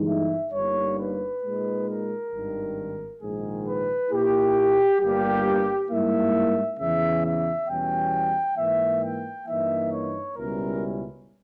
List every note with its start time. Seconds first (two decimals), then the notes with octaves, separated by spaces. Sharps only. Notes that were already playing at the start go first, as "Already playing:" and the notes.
Already playing: G1 G2 E3 G#3 D#4
0.08 E5
0.53 G1 G2 G3 A#3 D#4 C#5
0.98 B4
1.43 A#2 G#3 D#4
1.87 A#4
2.31 G#1 G2 D#3
3.21 A#1 G#2 D#3 G#4
3.66 B4
4.10 A#2 A#3 E4 G4
5.01 G1 G2 G3 A#3 G4
5.89 G#2 G3 A#3 E4 E5
6.78 E2 C#3 E3 E5
7.24 E5
7.68 E2 B2 G3 C#4 G5
8.57 G#2 E3 A#3 E5
9.02 G5
9.46 G2 E3 A#3 D#4 E5
9.91 C#5
10.36 C#2 B2 G3 C#4 E4 A#4